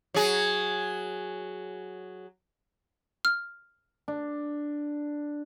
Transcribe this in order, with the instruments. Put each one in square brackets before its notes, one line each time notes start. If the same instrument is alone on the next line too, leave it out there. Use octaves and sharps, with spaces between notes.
[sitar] F#3 G#4
[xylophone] F6
[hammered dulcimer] D4